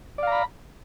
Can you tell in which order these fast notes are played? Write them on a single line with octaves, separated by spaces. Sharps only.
D5 F5 A#5 B5